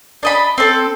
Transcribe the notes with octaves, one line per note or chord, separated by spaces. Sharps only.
D4 D#5 B5
C4 A4